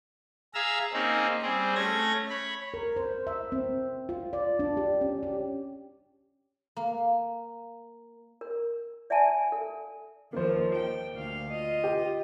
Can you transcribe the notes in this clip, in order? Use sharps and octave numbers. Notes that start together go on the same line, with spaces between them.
G#4 E5 F5 A#5 E6
A#3 C4 C#4 D#4 G#4
G3 C4 G#4
A3 C#4 G#6 A#6
C#5 B5
A#4
C5
E5
C4
F4
D5
D4
G4
C#4
G4
A#3
A#4
D5 E5 F#5 G#5 A5
A4
D#2 F3 A#3 C5
G5
D2 F5
F4 D#5
G4